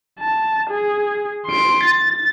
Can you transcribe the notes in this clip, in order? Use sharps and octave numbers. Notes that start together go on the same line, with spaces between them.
A5
G#4
C6 D7
A6